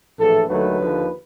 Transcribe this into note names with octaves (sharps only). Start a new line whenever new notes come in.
A#1 A2 E3 A4
D#2 D3 F#3 A3 B4
D#2 D3 F3